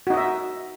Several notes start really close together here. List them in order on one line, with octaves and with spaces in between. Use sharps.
F#4 D#4 D#5 E5